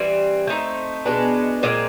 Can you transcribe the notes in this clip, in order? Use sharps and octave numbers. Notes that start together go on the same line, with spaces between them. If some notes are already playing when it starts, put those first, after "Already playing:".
Already playing: E3 G3 C4
A3 C4 D#4
B2 G#3 B3 D4
A#2 F3 G#3 C4